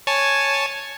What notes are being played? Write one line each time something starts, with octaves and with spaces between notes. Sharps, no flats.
C#5 G#5 A5